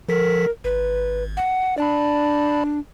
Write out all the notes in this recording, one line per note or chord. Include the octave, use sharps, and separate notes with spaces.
F3 A4 A#4 B6
G#1 B4
F#5
D4 D5 A5 B5